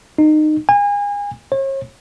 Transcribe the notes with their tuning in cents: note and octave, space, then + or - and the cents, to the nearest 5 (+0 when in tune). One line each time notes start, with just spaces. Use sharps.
D#4 -20
G#5 -35
C#5 -40